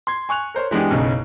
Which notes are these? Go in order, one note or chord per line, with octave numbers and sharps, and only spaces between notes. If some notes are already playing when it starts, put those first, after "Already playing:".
C6 G#6
G#5 C#6 F#6 F7
A#4 C5 C#5
E3 G#3 B3 D4 G4
F#1 B1 C#3 C#4 D#5